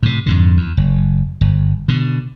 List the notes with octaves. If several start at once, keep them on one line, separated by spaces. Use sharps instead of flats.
A2 C3
F2 G#2 D3
E2
F#1
G1
B2 D3